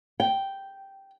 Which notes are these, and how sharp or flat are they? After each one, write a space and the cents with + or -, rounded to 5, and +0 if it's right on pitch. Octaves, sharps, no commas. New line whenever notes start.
G5 -5